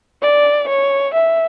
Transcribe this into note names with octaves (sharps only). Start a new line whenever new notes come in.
D5
C#5
E5